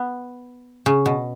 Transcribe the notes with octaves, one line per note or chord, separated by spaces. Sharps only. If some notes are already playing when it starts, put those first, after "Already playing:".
Already playing: B3
C#3
B2